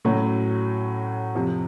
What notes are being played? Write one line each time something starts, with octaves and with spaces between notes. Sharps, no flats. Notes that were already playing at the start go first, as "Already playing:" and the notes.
A2 F#3 A3 C#4 F#4
F2 C3 F3